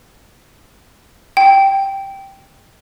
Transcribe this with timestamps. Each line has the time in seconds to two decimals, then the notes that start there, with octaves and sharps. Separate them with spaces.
1.37 G5